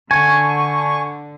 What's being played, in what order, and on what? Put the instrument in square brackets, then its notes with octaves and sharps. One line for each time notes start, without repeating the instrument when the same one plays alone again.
[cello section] D3 [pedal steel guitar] G#5 [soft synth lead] C#6